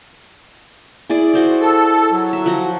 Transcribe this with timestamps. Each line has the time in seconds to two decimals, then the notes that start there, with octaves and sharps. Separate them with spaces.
1.10 E4 G#4 D5
1.33 F#4 C5 D5
1.62 A4
2.11 F#3
2.33 E5
2.46 F3 F#4